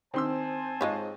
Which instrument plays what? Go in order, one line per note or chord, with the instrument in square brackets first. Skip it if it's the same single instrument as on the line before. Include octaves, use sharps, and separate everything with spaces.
[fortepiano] D#3 C6 E6 [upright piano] C4 [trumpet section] C5 G#5 A5
[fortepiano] G#2 D#5 [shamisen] G#3 F4 C#5